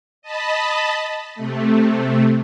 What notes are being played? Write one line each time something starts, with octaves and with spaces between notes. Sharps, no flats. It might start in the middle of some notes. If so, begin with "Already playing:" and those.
D#5 A5 B5
C3 A3